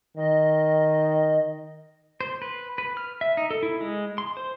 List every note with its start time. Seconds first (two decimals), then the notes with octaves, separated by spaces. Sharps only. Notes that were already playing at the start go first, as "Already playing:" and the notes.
0.16 D#3 D#5
2.21 C5
2.42 B4
2.78 B4
2.97 F6
3.21 E5
3.37 D#4
3.50 A4
3.63 E4
3.81 G#3
4.18 C6
4.37 C5